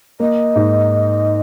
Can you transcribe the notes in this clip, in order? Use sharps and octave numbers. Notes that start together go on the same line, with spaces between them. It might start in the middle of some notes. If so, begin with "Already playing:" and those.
A#3 D#5
G#2